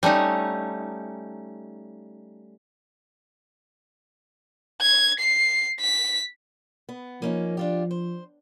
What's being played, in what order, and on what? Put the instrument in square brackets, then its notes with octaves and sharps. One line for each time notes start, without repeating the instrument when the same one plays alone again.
[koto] G3 A3 C#4 D#4
[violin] G#6
C7
B6
[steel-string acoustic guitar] B3
[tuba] F3 [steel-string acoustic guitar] A#3 C#4 D#4
[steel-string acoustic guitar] D4 F4 G4
C5